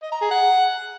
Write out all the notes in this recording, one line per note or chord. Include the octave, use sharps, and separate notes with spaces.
D#5
A#5
G#4
F#5